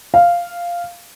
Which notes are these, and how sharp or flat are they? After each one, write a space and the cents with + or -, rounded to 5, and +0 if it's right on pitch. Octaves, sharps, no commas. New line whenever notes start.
F5 -5